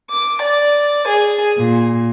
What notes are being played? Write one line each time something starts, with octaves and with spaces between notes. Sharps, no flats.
D6
D5
G#4
A#2